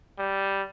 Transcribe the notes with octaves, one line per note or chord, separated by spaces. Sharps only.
G3